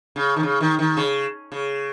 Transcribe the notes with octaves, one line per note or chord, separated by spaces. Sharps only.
C#3
D#3
C#3
D#3
D#3
C#3
C#3